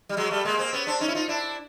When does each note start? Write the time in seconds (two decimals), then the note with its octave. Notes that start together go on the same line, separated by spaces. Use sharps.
0.09 G3
0.17 F#3 G#3
0.31 G3 A3
0.45 G#3 A#3
0.59 A#3 C4
0.73 B3 C#4
0.87 C4 D4
1.01 C#4 D#4
1.08 E4
1.15 D#4 F4
1.28 D4 E4